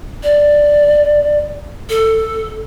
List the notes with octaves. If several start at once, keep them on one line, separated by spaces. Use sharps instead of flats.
D5
A4